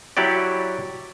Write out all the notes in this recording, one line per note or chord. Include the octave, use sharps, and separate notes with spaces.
F#3 E4 F#4 G4 D5